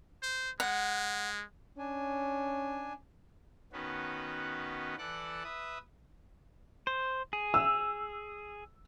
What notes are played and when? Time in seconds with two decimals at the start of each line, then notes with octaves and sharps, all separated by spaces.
0.22 C5
0.60 G#3 F#5
1.78 C#4 D4 G#5
3.72 D#3 B3 C#4 F#4 B4
4.98 E3 A4 D5 F#5 F#6
5.44 B4 E5 D#6
6.87 C5
7.33 G#4
7.54 E6